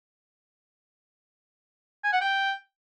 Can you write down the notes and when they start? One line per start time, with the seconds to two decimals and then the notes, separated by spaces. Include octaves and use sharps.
2.04 G#5
2.13 F#5
2.21 G5